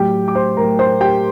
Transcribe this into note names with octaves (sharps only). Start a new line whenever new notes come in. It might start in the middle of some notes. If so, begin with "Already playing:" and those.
Already playing: A2 F#3 G4 G5
D6
C5 C6
A2 F#3 A#4 A#5
C5 C6
G4 G5